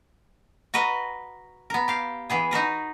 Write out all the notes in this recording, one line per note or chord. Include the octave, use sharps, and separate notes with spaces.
F#4 A#4 B4 D#5
B3 A#4
G4 F5
E3 B3 G#4
D#4 F#4 A#4 B4